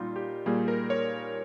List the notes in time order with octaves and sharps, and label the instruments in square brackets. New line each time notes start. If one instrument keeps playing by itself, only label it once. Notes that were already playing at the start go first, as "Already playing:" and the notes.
Already playing: [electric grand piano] A#2 G3 A#3 D#4 F4
G4
A#2 G3 A#3 G#4
A#4
C#5